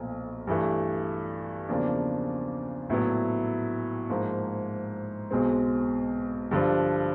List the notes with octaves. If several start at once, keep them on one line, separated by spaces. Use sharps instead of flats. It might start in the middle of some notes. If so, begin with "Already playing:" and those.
Already playing: B1 A#2 F3 A3
G2 E3 A3
E2 C#3 F3 A#3 D4
A#1 A2 F#3 B3 E4
G#2 F3 A#3
B1 B2 G#3 C4
G2 D3 F3